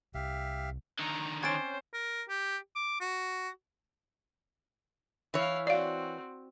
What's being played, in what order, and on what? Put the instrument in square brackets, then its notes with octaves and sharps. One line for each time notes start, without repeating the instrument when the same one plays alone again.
[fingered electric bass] C2 [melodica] G4 E5 F5
[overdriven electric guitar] D3 D#3 [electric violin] A#5
[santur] C4 C#4 D5 [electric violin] C5 [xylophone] G#6 A6 D7
[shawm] A#4
G4
D6
F#4
[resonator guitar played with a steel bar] E3 C#5 [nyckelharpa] E4 F5
[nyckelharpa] C4 F#4 [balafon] D5 F5